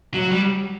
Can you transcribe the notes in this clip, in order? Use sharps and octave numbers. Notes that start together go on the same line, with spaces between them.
F#3
G3